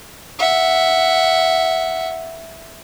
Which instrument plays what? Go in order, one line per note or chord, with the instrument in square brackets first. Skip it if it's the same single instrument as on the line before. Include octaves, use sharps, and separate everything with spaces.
[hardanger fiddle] E5 F#5